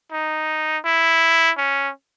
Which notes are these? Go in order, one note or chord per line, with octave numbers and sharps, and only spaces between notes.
D#4
E4
C#4